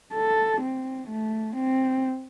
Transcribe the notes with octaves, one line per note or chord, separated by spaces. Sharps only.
A4
C4
A3
C4